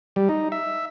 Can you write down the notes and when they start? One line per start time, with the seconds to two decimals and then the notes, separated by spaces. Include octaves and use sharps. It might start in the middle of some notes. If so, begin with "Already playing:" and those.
0.16 G3
0.29 D#4
0.52 E5